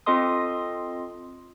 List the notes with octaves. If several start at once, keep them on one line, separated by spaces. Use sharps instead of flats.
C4 F4 A4 D#5 C6 D#6